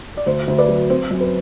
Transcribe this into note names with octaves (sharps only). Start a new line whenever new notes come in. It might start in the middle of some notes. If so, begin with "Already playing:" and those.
D5
D2 C5
D2 C5
B4 D5
F#3
C4 C5
F#2
B4